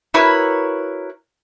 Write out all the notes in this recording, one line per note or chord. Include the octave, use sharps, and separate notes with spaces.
E4 F#4 A#4 B4 C#5